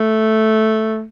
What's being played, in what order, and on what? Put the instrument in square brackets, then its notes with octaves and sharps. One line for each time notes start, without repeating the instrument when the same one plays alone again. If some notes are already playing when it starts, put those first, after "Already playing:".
Already playing: [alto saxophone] A3